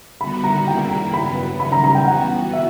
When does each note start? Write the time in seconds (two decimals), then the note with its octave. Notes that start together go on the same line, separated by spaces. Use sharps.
0.21 D3 G3 B3 F#4 B5
0.44 A#5
0.67 C#3 G3 A#3 E4 G5
0.91 A#5
1.14 G2 F#3 B3 B5
1.60 C#3 G3 C#4 B5
1.72 A#5
1.84 A#5
1.95 G5
2.07 E3 B3 F#4 F#5
2.53 E5